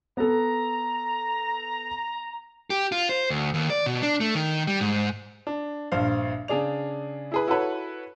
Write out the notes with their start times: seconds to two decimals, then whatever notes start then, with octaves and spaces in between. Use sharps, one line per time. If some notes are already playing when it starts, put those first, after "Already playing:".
0.17 B3 A4 A#5
2.70 G4
2.92 F4
3.09 C5
3.30 D2
3.54 D#2
3.70 D5
3.86 B2
4.02 D4
4.20 A3
4.35 D#3
4.67 G3
4.81 G#2
5.47 D4
5.92 A#1 G2 C5 F5
6.48 C#3 D4 G#4 D5 F7
7.32 E4 G#4 B4
7.48 E4 F#4 A4 B4 C#5